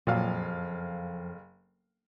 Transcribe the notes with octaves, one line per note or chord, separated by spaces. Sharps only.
F#1 F2 A#2 F#3 F5